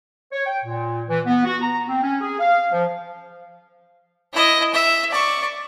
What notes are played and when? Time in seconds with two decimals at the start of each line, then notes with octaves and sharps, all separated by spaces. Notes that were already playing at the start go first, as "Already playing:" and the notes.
0.32 C#5
0.46 G5
0.65 A#2
1.08 E3
1.26 B3
1.44 F#4
1.61 A#5
1.88 C4
2.03 C#4
2.20 G#4
2.39 F5
2.72 F3
4.33 E4 D#5
4.73 E5
5.10 D5 C#6